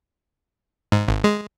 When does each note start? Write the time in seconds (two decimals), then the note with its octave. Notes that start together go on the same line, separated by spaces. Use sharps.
0.92 G#2
1.08 G#1
1.24 G#3